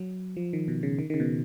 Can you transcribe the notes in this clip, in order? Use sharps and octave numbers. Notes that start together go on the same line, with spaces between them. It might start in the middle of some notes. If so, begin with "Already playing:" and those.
Already playing: F#3
F3
D#3
B2
C#3
D#3
D#3
C#3
B2